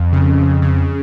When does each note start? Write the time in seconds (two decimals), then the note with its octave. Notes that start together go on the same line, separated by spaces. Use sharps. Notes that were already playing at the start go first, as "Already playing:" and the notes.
Already playing: F2
0.12 C#3
0.37 F2
0.62 C#3